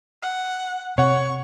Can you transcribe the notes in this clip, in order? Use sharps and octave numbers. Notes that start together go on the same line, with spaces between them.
F#5
C3 C#5 F#5 C#6